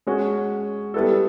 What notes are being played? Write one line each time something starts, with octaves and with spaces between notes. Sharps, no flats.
G#3 C#4 F#4
G3 B3 E4 A4